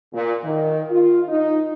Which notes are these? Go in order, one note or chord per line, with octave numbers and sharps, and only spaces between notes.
A#2
D#3
F4
D#4